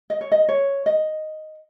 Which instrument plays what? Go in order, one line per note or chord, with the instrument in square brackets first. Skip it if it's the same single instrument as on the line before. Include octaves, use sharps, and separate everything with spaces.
[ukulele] D#5
C#5
D#5
C#5
D#5